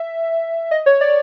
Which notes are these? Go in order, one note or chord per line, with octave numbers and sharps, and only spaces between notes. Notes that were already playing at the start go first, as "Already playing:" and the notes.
Already playing: E5
D#5
C#5
D5